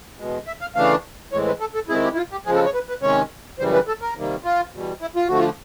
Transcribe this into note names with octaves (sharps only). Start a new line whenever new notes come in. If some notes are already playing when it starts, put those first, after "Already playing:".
E2 B2 G#3
E5
F5
C#3 E3 A3 D4 F5
A2 E3 G#3 C4 C#5
B4
A4
A4
D#3 G#3 C4 E4 G#4
G4
E4
F4
G4
C#3 F3 G#3 G#4
A4
C#5
B4
B4
C3 D#3 G#3 C#4 C#5
F#2 C#3 E3 G3 C5
B4
A4
A#4
C3 D#3 G3 A#3
F4
E2 B2 G3
E4
F4
D3 F3 A3 F#4
F4